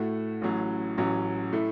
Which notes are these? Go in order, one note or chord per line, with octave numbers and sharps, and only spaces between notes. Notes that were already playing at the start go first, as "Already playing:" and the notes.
Already playing: A2 A3 F#4
A1 A2 F#3 C#4
A1 A2 F#3 C#4 F#4
A2 A3 E4